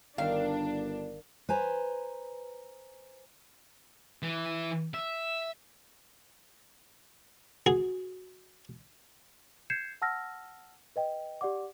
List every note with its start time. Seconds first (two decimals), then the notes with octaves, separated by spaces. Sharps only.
0.18 G1 D#3 D4 F5
1.49 B4 C5 G#5 A#5
4.23 E3
4.94 E5
7.66 F#4 G#4
9.70 G6 G#6 C7 C#7 E7
10.02 F#5 A5 E6 F6 A#6
10.96 B4 D#5 G5
11.41 G4 D5 F#5 D6